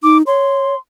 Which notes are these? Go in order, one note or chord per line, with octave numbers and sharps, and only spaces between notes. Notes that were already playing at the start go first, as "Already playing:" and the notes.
D#4 D6
C#5 C6